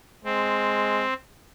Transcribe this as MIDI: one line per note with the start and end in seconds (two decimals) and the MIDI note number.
0.25 1.04 56
0.25 1.14 60